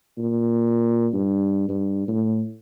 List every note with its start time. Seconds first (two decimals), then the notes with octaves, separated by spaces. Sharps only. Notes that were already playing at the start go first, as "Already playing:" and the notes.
0.18 A#2
1.13 G2
1.69 G2
2.08 A2